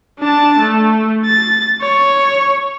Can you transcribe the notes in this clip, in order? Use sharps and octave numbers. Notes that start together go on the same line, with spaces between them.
D4 A5
A3
A6
C#5